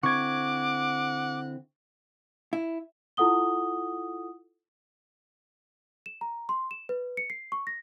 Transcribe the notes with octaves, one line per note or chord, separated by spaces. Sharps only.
D3 C4 E4 F#5 C#6 D6 G#6
E4
E4 F4 A4 F#5 D#6 G7
E7
A#5
C6
E7
B4
C#7
C7
C#6
A#6